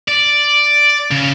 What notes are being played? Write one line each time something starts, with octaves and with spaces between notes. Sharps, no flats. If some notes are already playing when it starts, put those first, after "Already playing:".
D5
C#3